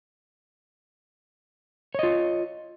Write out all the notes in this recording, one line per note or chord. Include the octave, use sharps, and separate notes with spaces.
F4 C#5 D#5